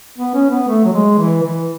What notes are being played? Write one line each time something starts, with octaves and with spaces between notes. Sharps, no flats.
B3
C#4
B3
A3
F#3
G#3
E3
E3